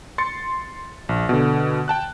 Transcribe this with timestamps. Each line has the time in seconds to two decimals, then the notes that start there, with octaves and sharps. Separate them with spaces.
0.18 C6 A6 C#7
1.09 A#1
1.29 B2 D3
1.88 G5 A5 F#6